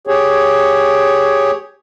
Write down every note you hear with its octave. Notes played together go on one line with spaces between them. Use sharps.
G4 G#4 C#5